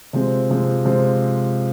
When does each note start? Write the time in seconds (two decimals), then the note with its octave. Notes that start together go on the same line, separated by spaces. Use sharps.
0.13 C3 F3 G#3 C4
0.50 C3 F3 G#3 C4
0.85 C3 F3 G#3 C4